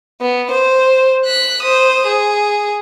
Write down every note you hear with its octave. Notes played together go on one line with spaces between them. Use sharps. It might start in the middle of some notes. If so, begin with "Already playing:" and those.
B3
C5
F#6 B6
C5 D#6
G#4